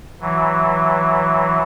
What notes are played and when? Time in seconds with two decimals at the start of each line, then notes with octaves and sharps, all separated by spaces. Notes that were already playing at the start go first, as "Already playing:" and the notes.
0.21 E3 F#3